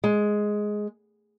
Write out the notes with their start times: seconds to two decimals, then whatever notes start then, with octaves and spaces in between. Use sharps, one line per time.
0.04 G#3